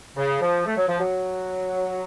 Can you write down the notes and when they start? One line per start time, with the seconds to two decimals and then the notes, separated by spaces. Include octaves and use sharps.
0.17 C#3
0.41 F3
0.66 A3
0.77 F#3
0.88 F3
0.99 F#3